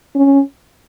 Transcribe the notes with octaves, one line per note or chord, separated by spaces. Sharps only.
C#4